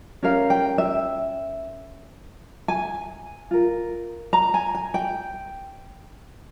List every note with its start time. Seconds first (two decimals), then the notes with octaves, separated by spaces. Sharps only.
0.23 C#4 G4 A#4 F5
0.50 G5
0.78 E5
2.68 G#5
3.51 F4 A#4
4.33 A#5
4.54 G#5
4.75 G#5
4.94 G5